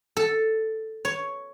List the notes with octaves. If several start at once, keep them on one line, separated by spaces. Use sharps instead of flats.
A4
C#5